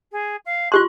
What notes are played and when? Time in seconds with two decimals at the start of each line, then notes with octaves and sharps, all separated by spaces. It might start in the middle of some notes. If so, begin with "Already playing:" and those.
0.12 G#4
0.45 F5
0.72 F4 G4 C6 F#6